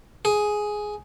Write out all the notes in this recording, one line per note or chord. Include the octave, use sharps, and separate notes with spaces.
G#4